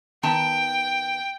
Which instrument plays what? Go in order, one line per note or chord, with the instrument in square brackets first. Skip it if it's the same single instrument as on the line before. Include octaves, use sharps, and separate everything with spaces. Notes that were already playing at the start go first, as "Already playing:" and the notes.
[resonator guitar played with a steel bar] D#3 B3 A5 [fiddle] G5